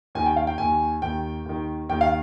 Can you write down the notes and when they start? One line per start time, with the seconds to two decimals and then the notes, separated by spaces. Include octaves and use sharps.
0.15 D#2 D#3 G#5
0.26 G5
0.36 F5
0.47 G5
0.58 D#2 D#3 G#5
1.02 D#2 D#3 G5
1.45 D#2 D#3
1.89 D#2 D#3 G5
2.01 F5